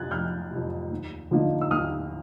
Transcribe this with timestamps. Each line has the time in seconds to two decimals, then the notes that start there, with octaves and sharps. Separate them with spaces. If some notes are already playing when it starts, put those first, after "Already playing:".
Already playing: F2 C3 F#6 G#6 A6
0.11 F1 F6 G6
0.51 F2 C3
0.91 D#2
1.31 D3 F3 A#3 D#4
1.61 E6
1.71 D#2 D#6 F6